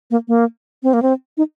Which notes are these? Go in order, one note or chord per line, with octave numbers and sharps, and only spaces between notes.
A#3
A#3
C4
A#3
C4
D#4